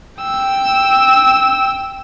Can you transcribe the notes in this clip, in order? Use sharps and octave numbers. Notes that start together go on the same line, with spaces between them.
G5 E6